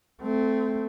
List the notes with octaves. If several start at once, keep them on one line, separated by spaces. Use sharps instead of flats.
A3 C4